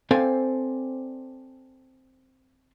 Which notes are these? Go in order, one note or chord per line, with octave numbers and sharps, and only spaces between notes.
C4 A4 C5 D5 F5 G#5